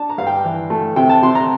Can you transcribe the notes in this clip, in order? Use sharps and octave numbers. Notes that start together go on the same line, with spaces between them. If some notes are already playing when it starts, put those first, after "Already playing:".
Already playing: D4 A5
A#5
G2 F5
G5
E3
A3
C3 G5
A5
C3 C6
A#5